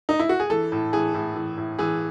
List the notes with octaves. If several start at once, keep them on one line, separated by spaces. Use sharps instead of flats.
D#4
E4
F#4
G#4
E3 A4
A2
E3 G#4
A2
E3
A2
E3 G#4